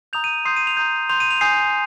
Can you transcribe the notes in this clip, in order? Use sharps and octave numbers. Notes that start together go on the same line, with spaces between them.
A#5 D#6 G6 F7
D#7
C6 D#6 G6 C7
D#7
F7
A#5 D#6 G6
C6 G6 F7
D#7
F7
G#5 D#6 G6 C7